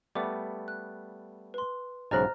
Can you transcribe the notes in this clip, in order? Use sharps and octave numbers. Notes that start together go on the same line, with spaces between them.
G3 A3 B3 D5 D6
F#6
B4 C6
B1 G#2 C#3 C5 D#5 A#5 F6 A#6